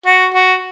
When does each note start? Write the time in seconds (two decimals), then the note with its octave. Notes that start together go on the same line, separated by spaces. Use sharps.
0.06 F#4
0.34 F#4